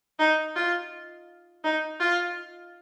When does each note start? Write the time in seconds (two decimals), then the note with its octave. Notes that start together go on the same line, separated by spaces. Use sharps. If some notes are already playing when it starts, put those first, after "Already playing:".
0.19 D#4
0.56 F4
1.64 D#4
2.00 F4